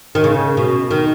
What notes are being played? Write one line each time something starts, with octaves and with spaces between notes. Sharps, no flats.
D#3
C#3
B2
D#3